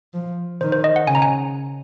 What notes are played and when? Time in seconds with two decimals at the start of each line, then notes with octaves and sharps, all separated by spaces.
0.14 F3
0.61 D#3 C5
0.72 C5
0.84 D#5
0.96 F#5
1.07 C#3 G#5
1.15 A#5
1.22 G#5